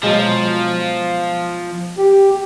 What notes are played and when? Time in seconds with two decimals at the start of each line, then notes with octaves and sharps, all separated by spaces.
0.03 B2 F3 F#3 G#3
1.98 G4